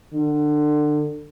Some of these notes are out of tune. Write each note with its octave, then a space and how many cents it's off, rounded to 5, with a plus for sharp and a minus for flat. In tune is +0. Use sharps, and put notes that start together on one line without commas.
D3 +25